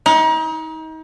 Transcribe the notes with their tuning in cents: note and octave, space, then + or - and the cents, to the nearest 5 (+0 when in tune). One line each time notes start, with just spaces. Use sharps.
D#4 +35